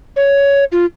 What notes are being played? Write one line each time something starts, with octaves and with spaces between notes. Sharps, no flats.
C#5
F4